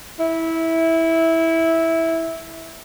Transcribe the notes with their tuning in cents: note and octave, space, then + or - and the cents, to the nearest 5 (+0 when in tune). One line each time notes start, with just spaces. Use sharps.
E4 -10